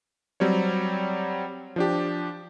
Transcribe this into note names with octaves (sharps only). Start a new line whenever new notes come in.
F#3 G3 C4 C#5
F3 D4 G4